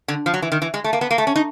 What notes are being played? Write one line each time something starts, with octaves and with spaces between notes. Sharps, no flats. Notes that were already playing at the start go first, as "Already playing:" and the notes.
D3
F3
F#3
E3
D#3
E3
G#3
A3
A#3
B3
A#3
A3
C#4
D#4